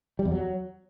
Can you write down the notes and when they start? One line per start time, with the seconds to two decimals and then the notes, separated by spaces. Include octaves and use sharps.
0.19 G3
0.25 E2
0.32 F#3